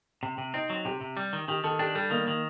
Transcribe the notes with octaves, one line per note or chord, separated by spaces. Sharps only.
C3
C3
C4 D#4
F#3
C3 G4
C3
G3
D#3
D#3 G4
D#3 A4
D4 G4
G3 A4
D#3 A#3
D#3